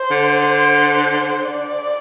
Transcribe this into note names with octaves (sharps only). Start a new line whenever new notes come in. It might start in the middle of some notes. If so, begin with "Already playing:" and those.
Already playing: C5
D3
D5